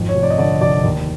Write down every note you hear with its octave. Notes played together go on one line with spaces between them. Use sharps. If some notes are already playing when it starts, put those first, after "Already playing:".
Already playing: G#1 F2
C#5
F1
D5
D#5
D3 D5
F1 D5
D#2